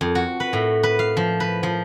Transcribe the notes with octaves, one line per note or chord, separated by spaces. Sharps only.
F2
F#4
B4
A2
B4
F5
F3
B4
F3